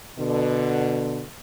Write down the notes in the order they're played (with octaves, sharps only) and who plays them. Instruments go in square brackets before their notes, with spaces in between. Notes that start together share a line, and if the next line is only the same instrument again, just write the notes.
[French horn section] B2 D3